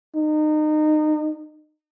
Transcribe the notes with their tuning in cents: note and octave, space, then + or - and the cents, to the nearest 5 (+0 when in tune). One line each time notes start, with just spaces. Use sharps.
D#4 -30